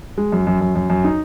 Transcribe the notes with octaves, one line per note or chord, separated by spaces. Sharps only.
G#3
F#2
F#2
F#2
F#2
F#2
D#4